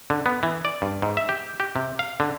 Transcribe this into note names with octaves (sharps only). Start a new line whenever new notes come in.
D3
B3
E3
D5
G2
G#2
E5
G4
G4
C3
F5
D3